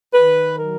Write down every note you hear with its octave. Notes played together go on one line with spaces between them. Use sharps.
D#3 B4
F#3 A#4